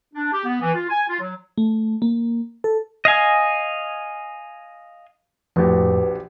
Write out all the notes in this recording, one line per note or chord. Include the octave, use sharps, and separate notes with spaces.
D4
G4
B3
E3
F4
G#5
F4
F#3
A3
A#3
A4
D#5 F5 G#5
A#1 F2 A2 F#4 G4 B4